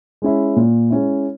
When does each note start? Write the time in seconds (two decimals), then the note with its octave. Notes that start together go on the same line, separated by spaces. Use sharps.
0.22 G#3 C#4 E4
0.56 A#2
0.90 G#3 C#4 E4